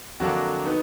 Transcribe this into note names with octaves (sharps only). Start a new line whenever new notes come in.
F2 D3 F#3 A#3 D4 F#4
B3 D#4